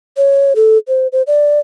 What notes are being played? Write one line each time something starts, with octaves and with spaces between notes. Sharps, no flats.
C#5
A4
C5
C5
D5